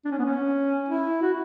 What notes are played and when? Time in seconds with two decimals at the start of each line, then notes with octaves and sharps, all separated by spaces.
0.05 D4
0.11 C#4
0.19 B3
0.25 C#4
0.89 E4
1.22 F#4